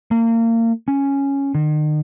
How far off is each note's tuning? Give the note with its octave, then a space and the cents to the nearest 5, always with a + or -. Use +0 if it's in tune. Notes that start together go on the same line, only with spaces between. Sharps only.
A#3 -30
C#4 +0
D#3 -40